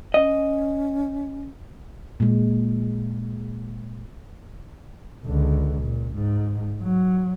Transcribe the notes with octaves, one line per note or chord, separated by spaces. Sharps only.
C#4 D#5
A#2 G#3
C#2 D3
A#2
G#2
F#3